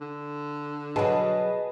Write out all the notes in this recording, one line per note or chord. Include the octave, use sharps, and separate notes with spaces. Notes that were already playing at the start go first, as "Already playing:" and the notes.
D3
B2 F#3 G#4 B4 D#5 A5